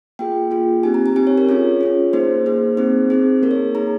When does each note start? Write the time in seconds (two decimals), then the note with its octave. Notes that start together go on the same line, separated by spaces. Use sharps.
0.19 A#3 F4 G#4 G5
0.51 A#3 F4 G#4
0.83 C4 D#4 G4 G#5
0.94 A#5
1.06 G#5
1.16 C4 D#4 G4 G#5
1.27 C#5
1.38 A#4
1.49 C#4 F4 G#4 C#5
1.81 C#4 F4 G#4
2.13 A#3 D#4 G#4 C5
2.46 A#3 D#4 G#4
2.77 C4 D#4 G#4 C5
3.10 C4 D#4 G#4
3.42 A#3 D#4 G#4 A#4
3.51 C#5
3.75 A#3 D#4 G#4 A#5